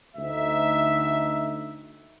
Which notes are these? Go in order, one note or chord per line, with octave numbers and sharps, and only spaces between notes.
D2 D#4 E5